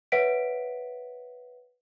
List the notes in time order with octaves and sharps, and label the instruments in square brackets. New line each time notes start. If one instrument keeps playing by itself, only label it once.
[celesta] B4 C#5 E5 F#5 B6 D7